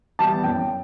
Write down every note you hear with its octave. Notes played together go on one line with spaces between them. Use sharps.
E3 G3 B3 A5
F#2 G5